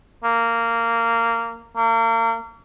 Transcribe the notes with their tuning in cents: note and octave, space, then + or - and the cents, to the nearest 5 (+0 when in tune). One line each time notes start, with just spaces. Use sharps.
A#3 -15
A#3 -35